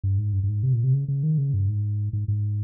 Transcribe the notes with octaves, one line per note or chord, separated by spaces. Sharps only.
G2
G#2
G2
G2
G#2
C3
A#2
C3
C#3
C#3
D#3
C#3
G2
G#2
G#2
G#2